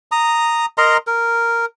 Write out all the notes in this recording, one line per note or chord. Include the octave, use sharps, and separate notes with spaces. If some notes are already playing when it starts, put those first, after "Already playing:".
A#5 D#6
A#4 D#5 A#5 C6
A#4